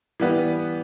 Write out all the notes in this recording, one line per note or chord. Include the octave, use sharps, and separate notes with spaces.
E3 G3 B3